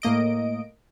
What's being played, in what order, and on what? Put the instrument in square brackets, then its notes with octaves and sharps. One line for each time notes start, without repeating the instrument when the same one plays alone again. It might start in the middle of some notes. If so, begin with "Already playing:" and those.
[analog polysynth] A2 A#3 D#5 D7